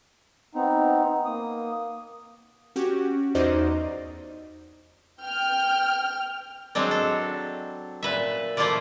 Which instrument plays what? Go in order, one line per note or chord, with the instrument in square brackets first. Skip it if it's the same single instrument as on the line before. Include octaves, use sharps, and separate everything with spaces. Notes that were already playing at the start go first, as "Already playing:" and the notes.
[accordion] B3 C4 D#4
A#3 D#6
[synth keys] C#4 F#4 G4
E2 D#4 F#4 C5 D5 D#5
[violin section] G5 F6
[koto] F#3 G#3 C4 D4
A4
A#2 B4 E5
F3 A3 A#3 E4 F4 D5